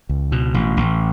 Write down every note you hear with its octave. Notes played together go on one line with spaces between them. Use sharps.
C#2
B2
A1
A1